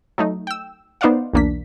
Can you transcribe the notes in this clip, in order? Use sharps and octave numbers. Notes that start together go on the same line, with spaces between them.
F#3 A3 D#4
G5 E6
B3 D#4 C5 D5 F5 F#5
B1 E2 A#3 D4 B6